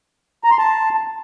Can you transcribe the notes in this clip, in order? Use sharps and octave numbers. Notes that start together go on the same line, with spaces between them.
A#5
C6
A5